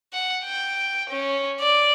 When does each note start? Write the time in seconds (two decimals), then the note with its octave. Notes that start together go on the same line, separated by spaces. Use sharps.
0.13 F#5
0.44 G5
1.09 C#4
1.60 D5